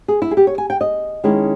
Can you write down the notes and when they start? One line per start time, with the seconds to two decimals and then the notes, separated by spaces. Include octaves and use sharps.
0.08 G#4
0.22 E4
0.31 G#4
0.37 G4
0.47 C#5
0.58 G#5
0.70 G5
0.81 D#5
1.24 D#3 G#3 C#4 E4